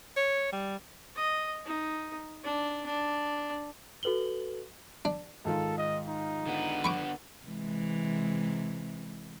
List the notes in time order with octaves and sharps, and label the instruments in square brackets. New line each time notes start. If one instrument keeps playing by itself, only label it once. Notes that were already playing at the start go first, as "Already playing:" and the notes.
[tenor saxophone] C#5
G3
[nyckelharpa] D#5
D#4
D4
D4
[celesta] F#4 A4 B4 F#7 G7
[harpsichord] D4
[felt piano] G#2 D#3 F4 [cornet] A4
[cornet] D#5
D#4
[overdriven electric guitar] D3 B3
[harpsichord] B5 C#6 D6
[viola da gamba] C3 E3 G#3